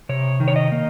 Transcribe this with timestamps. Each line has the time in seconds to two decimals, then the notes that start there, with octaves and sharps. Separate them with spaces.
0.09 C3 C#5
0.40 D#3
0.48 C#5
0.56 D#5
0.72 A#3